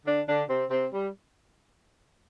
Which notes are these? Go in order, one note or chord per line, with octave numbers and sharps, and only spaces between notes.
D3 D4
D3 D4
C3 C4
C3 C4
G3